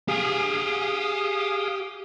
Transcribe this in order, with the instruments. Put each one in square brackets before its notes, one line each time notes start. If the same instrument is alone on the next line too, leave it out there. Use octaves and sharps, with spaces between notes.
[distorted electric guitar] G4 G#5 [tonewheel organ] G#4 F5 D#6